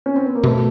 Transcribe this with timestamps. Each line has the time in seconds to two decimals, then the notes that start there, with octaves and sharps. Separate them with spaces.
0.06 C#4
0.16 C4
0.25 B3
0.35 A#3
0.43 B2 A3